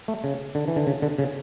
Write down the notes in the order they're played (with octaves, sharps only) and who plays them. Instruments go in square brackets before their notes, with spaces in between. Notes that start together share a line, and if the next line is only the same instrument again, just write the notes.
[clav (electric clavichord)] A3
C#3
D3
E3
D3
C#3
D3
C#3